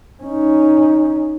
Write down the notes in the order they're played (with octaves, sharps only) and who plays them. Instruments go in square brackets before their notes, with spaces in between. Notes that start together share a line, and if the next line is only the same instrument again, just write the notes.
[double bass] C#4 D#4